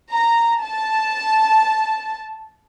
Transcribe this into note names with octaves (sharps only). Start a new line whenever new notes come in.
A#5
A5